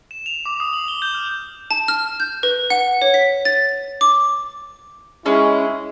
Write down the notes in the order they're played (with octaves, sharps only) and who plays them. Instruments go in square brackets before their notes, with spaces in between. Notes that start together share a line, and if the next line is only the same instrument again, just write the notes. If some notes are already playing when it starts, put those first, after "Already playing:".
[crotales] E7
F7
D6
D#6
F#7
G7
G6
F6
[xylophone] A5
F6
G6
B4
F#5
C#5
B6
A6
D6
[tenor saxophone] G#3 [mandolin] C#4 [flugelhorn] E4